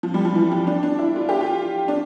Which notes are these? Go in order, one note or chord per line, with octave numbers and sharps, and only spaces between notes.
F3
G3
F3
E3
F3
D4
D4
E4
F4
G4
F4
D4